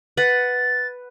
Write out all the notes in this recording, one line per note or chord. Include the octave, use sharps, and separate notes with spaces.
B4 F#5 A6